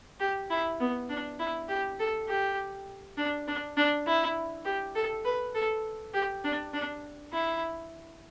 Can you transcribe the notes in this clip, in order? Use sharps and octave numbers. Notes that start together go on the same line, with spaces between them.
G4
E4
B3
D4
E4
G4
A4
G4
D4
D4
D4
E4
G4
A4
B4
A4
G4
D4
D4
E4